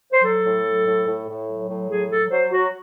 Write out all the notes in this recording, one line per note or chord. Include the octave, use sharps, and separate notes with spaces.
C5
F#3 A4
A2
F#3
A2
A2
A2
F#3
A2
F#3 G#4
F#3 A4
F#3 C5
F#3 F#4